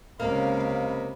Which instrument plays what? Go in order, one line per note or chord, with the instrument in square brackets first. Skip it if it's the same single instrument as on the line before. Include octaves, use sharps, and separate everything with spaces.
[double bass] C#2 C#4 [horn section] C3 D#5 B5 [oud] A#3 [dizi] F5